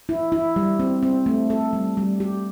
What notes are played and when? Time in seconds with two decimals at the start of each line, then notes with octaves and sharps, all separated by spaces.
0.09 E4
0.32 E4
0.56 G3
0.79 C4
1.03 C4
1.26 A3
1.50 A4
1.73 G3
1.97 G3
2.20 G4